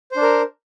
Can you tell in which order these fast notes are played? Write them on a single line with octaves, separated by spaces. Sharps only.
C5 D4 A#4